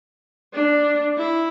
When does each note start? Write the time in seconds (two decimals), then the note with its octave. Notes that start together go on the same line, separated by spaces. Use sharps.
0.54 D4
1.18 E4